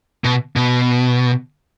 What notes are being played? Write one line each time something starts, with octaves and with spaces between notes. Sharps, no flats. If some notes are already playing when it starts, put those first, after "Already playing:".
B2
B2